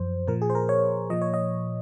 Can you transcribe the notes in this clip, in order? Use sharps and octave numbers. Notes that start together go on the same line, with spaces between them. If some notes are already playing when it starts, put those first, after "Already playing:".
Already playing: F#2 F3 C5
A#2 F3 A#4
G#4
C5
A#4
C#5
A#2 F3 D#5
C#5
D#5